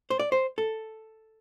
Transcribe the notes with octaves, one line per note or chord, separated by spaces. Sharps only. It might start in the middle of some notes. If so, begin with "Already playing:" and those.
C5
D5
C5
A4